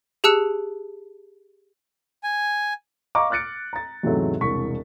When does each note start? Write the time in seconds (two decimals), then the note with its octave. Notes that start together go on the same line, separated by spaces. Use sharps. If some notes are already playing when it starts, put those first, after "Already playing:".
0.24 G4 G#4 A5 E6 F#6 C#7
2.23 G#5
3.15 D#5 F5 A#5 C#6 D6
3.30 D6 F6 F#6 A6 C#7 D7
3.73 A#5 A6
4.03 E2 G#2 C3 F#3 A3
4.41 E1 C2 C#6 B6